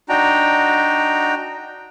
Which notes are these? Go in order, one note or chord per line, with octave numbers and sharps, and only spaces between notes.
D4 D#4 F#4 G5 A#5